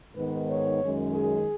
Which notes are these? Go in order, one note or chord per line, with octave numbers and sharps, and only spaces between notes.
G#2 D#3 B3 B4
C#5
F#2 D#3 G#3 C#4
G#4